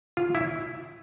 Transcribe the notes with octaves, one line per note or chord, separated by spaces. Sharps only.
F4
E4